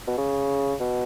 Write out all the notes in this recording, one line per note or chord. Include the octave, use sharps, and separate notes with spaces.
B2
C#3
B2